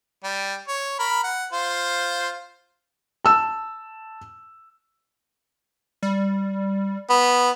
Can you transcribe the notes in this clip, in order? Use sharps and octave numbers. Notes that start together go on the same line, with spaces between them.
G3
C#5
A#4 B5
F#5
F4 C5
A5 E6
G3
B3